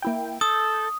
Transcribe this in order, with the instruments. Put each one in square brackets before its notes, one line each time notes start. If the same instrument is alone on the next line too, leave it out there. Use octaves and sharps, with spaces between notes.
[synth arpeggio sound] A#3 E4 G5
[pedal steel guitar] A4 [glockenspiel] D#6 [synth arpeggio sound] G6